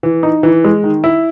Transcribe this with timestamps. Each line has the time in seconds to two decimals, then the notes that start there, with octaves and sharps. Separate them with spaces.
0.03 E3
0.23 D#4
0.43 E3
0.64 G#3
0.83 D#3
1.04 E4